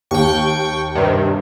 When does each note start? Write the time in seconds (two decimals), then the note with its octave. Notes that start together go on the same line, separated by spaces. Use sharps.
0.11 D#2 G5 C#6
0.95 G2 C3 D#3